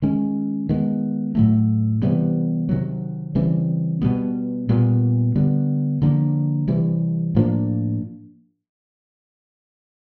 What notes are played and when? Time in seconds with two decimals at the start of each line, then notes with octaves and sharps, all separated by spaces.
0.02 D#3 G#3 C#4
0.69 D#3 G#3 B3
1.35 A2 F#3 A3
2.02 C3 E3 G3 B3
2.69 C3 D#3 F#3
3.35 C#3 E3 G3 C4
4.02 B2 G3 B3
4.69 A#2 G3 B3
5.35 D3 G3 B3
6.02 D3 F3 A#3 D4
6.68 C3 E3 G3
7.35 A2 F3 A#3 D4